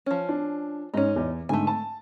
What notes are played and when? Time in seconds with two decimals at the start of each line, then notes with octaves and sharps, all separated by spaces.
0.06 F3 C#4
0.29 D4
0.94 G#2 C#4 D#4
1.16 E2
1.49 G#2 D3 A3 G#5
1.67 A5